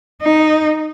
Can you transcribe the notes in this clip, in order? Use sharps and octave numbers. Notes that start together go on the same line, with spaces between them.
D#4